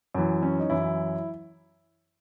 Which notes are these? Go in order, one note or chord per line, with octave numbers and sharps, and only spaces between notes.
F#2 E3
C#4
D#4
F#2 E3 E4